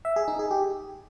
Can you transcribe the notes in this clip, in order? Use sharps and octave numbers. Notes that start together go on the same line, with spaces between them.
E5
G#4
D#4
G#4
G4